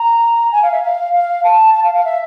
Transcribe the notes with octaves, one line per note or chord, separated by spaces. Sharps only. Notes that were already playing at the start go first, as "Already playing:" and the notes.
Already playing: A#5
G#5
F5
E5
F5
F5
A5
A5
F5
F5
E5